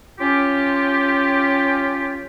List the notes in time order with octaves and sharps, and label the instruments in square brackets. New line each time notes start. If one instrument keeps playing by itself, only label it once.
[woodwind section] C#4 F4 G4